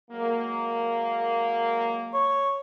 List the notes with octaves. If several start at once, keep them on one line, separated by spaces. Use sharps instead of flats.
F#3 G#3 A#3
C#5